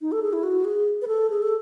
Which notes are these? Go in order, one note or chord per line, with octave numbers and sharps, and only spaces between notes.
D#4
A4
G#4
E4
F#4
G#4
B4
A4
G#4
A4